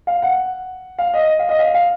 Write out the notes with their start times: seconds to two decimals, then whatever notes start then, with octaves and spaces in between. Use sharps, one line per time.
0.07 F5
0.22 F#5
0.98 F5
1.14 D#5
1.39 F5
1.49 D#5
1.59 F5
1.74 F5